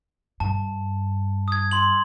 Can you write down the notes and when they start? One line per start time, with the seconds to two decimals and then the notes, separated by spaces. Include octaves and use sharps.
0.40 G2 A5
1.48 D#6 G#6
1.71 C6 F#7